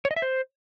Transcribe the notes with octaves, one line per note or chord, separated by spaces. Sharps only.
C#5
D#5
E5
C5